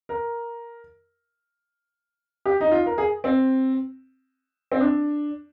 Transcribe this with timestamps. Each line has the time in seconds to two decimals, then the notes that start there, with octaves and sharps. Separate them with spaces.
0.09 A#4
2.46 G4
2.61 D#4
2.72 F4
2.86 A#4
2.98 G#4
3.24 C4
4.72 C4
4.80 D4